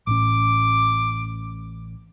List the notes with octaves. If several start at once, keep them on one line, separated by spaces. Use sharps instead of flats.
A1 A2 C#4 D6